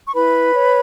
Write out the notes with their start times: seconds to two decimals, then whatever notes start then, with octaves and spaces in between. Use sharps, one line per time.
0.06 C#6
0.15 E4 B4 B5
0.55 C#5